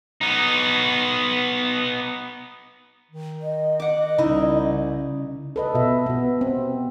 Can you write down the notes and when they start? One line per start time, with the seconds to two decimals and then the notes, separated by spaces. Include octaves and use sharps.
0.21 B3 D#4
3.11 D#3
3.41 D#5
3.80 F#5 D6
4.18 C2 C#3 D#4 E4
5.56 A4 B4 D#5
5.75 B2 E5
6.06 B2 B3
6.41 C4